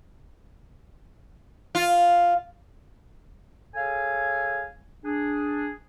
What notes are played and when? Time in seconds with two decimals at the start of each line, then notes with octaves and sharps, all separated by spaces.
1.75 F4
3.75 G#4 A4 C#5 F5 G#5
5.05 D4 G#4